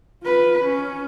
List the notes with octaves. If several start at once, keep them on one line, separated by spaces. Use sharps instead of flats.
F4 B4
C#4